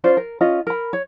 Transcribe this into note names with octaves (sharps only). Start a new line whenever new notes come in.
C#4 F4 C5 D5
A#4
C#4 F4 D#5
A#4 B5
C#5